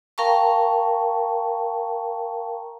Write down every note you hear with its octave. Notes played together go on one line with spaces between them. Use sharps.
A#4 F5 G5 A5 A#5 C#6